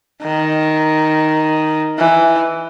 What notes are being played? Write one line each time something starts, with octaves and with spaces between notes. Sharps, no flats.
D#3
E3